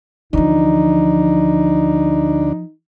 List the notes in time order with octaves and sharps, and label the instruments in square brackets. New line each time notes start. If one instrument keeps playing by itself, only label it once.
[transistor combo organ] D2 D4 [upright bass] E3 F3 [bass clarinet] D#4